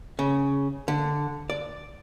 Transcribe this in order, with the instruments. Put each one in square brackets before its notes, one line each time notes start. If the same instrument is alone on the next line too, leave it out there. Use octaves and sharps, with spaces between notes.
[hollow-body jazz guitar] C#3
D3
D5